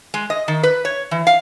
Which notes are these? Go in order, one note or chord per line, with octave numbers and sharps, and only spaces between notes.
G#3
D#5
D#3
B4
C#5
E3
F5